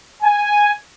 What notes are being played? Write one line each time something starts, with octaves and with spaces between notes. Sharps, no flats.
G#5